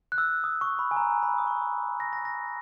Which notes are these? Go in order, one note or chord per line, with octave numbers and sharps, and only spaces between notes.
F#6
E6
D#6
C#6
B5
G#5
A#5
B5
D#6
C#6
A#6
A#6
A#6